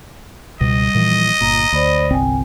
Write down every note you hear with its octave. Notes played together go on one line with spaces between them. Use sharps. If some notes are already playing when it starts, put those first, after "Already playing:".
C#2 B2 G3 D#5
A#2 E3 F3
G1 A#2 A#5
D2 C5 D5 B5
G1 C2 C4 G5 G#5